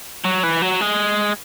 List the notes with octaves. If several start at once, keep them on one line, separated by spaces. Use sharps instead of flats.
F#3
E3
F#3
G#3